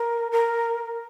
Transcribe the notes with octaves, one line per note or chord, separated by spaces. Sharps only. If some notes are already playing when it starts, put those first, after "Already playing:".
Already playing: A#4
A#4